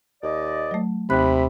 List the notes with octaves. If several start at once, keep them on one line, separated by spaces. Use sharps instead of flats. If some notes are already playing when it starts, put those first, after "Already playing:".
D#2 D5 D#5
F#3 A3
D#2 C3 B5 F#6